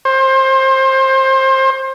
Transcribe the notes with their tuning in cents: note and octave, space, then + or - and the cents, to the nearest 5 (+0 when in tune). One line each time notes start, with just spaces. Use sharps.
C5 +25